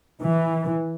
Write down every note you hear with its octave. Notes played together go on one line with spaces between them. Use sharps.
E3